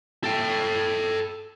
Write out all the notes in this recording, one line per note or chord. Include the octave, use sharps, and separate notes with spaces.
A4 G5